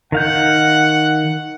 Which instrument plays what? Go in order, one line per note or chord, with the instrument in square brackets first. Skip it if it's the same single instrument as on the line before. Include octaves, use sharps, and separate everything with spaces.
[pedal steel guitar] D#3 F5 G6 [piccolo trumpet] F#5